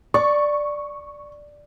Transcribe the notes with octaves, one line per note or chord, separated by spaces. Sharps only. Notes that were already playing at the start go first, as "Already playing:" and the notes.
D5 C#6